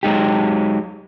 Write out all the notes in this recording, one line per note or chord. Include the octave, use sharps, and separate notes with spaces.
F#3 G#3 D#4 G4